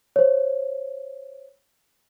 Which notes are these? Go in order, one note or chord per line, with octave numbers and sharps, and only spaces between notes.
C5 C#5